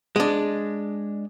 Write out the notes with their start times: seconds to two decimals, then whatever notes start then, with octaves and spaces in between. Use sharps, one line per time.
0.16 G#3 D4